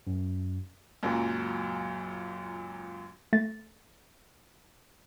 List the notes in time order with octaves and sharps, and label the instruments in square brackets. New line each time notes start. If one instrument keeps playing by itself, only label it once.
[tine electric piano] F#2
[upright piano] C#2 F#2 A#2 F#3
[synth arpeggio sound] A3 A6